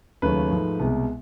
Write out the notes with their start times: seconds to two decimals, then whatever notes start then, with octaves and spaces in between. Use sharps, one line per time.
0.22 D#2 C#3 F#3 A3 B4
0.51 G#2 F3 A3
0.79 C2 B2 G#3